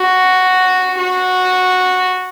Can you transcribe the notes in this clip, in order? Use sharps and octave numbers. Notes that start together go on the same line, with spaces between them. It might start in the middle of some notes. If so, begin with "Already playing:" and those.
Already playing: F#4
F#4